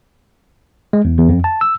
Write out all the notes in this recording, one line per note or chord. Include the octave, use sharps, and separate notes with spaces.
G#3
E2
E2
F2
A5
E6